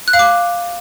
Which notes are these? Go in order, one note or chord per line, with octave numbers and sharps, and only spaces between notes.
F#6
F5
D6